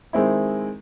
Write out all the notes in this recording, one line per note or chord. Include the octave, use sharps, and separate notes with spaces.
D#3 G#3 C4 E4